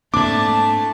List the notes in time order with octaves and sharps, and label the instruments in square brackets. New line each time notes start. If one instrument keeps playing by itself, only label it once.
[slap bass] G#2 A#3 C4 [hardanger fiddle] A3 A5 [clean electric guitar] D4 E4 [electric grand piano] D6